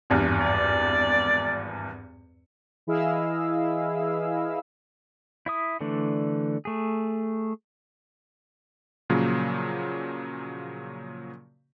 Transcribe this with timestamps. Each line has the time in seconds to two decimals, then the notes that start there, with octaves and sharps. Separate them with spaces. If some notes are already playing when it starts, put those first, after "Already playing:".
0.10 G#1 E2 G2
0.40 D5
2.87 E3 E4 G#4 D#5 F5 E6
5.46 E4 E5 D#6
5.81 D3 E3 A3 D4
6.65 A3 G#4
9.10 A#2 C#3 F3 F#3 A#3